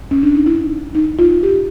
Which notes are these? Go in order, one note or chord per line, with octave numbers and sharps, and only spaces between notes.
C#4
D4
D#4
E4
D#4
F4
G4